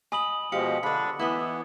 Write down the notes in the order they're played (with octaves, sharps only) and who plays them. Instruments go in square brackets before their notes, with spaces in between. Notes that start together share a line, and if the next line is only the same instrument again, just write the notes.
[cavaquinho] D#5 B5 [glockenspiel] G#5 D#6 F#7
[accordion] B2 F3 G#3 [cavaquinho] G4 F5 [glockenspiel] C#7
[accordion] D3 D4 [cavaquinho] B4 B5
[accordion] E3 B3 [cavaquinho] E4 D#5 E5